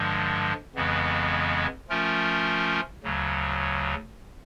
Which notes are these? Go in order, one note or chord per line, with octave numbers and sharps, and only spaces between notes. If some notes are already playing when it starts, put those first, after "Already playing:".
Already playing: G2 D3 F3 G#3
F2 C#3 E3 G#3 B3
F3 A3 C#4 F4 A#4
D2 C#3 F#3